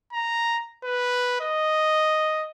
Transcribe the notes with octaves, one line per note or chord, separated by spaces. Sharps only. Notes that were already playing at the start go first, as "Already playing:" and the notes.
A#5
B4
D#5